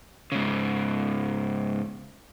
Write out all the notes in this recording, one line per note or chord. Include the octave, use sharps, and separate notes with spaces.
G#2 C#3